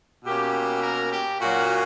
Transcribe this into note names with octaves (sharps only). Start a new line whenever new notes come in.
B2 A#3 C#4 G4
G4
A#4
G4
A#2 F#3 A#3 C#4 F#4